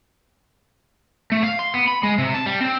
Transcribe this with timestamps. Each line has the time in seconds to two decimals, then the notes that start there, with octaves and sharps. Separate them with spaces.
1.32 A3
1.43 F5
1.59 C6
1.74 B3
1.88 B5
2.03 G#3
2.18 C3
2.34 A5
2.46 G3
2.61 C4